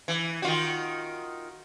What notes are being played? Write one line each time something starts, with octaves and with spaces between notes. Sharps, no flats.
E3
D#3 F4 F#4